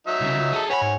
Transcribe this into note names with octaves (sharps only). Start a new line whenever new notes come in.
F#3 D#4 E5
C2 C#3
C#2
G#4 A4
B4 C#5 F#5 G#5 B5
G#2